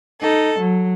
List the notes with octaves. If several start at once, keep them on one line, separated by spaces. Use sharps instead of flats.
D#4 A4
F#3